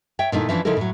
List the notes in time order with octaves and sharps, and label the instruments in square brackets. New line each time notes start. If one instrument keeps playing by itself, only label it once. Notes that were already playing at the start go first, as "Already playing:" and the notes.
[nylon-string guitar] C#5 E5 G5
A#2 D#3 A3 D#4 E4
E3 F3 C#4 D4 E4
C#3 F3 D#4 E4 A4 A#4
A2 F#3